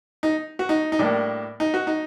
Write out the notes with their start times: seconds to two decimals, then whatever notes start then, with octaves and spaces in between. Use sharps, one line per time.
0.23 D#4
0.59 F#4
0.69 D#4
0.92 D#4
0.99 A2 G3 A#3 D4
1.60 D#4
1.74 F#4
1.87 D#4